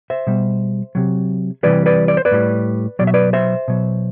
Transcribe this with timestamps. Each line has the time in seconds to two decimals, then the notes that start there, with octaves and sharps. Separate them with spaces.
0.10 C5 E5
0.27 B2 G3
0.95 C3 F#3
1.63 C3 E3 G3 B4 D5
1.86 B4 D5
2.08 D5
2.17 C5
2.25 B4 D5
2.32 A2 G3
2.99 B2 F#3 D5
3.07 E5
3.14 B4 D5
3.33 C5 E5
3.68 B2 F#3